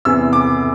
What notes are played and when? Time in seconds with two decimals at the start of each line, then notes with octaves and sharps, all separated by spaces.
0.05 E2 C3 E3 E6
0.33 D6